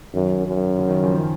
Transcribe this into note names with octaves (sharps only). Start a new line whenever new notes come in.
F#2 D#3
F#2
C#3
D#3
C#3 F3
D#3